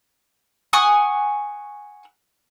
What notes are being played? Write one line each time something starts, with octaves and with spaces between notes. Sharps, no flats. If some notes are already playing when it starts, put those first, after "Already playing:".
F#5 G#5 C#6 D#6